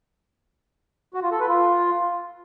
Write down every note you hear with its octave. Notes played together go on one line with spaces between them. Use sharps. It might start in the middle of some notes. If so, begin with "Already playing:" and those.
F#4
F4
A4
B4
F4